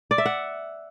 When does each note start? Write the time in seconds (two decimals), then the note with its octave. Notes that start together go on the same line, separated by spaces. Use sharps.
0.11 D5
0.18 E5
0.26 F#5